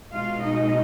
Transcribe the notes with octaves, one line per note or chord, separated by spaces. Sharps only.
B2 G#3 F4 F5
D#4 D#5